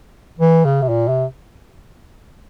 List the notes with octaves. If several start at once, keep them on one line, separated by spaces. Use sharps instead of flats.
E3
C#3
C3
A#2
C3